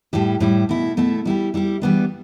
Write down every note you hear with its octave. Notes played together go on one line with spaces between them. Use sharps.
A2 G3 E4 G4
A2 G3 E4 G4
B2 A3 E4
B2 A3 E4
G3 E4 G4
G3 E4 G4
E3 G3 B3 D4